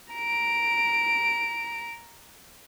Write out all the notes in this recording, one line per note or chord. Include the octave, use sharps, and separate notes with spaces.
A#5 D7